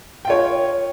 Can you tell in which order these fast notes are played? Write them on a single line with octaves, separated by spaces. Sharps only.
G5 F4 C#5